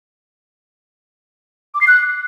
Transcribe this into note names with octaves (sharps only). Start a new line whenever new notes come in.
D6
C7
F#6